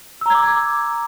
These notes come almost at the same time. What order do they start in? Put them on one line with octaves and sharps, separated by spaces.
E6 A#5 G#6 D6